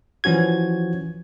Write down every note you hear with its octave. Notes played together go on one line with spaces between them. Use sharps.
E3 F3 C#4 F#4 G#6